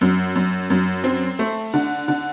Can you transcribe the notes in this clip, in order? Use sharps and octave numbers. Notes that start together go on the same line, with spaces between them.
F#2
F#2
F#2
C4
A3
D3
D3